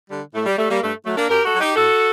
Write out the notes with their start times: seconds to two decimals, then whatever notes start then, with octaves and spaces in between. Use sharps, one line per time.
0.10 D3 G3
0.34 A2 A3
0.46 G3
0.58 G3 A3
0.70 G3 A#3
0.81 G2 A3
1.05 F#3 A3
1.17 A#3 D4
1.29 F#2 G4 A#4
1.44 F#4 A4
1.53 F#3
1.60 D#4 G4
1.76 A2 F#4 A4